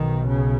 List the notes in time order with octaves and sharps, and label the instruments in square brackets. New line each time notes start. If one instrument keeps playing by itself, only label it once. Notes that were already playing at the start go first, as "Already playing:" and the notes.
Already playing: [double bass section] B1 B2 D#3
C#3